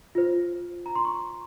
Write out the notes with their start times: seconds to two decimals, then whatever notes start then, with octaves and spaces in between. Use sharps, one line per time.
0.15 F4 C5
0.86 A#5
0.95 C6
1.05 C#6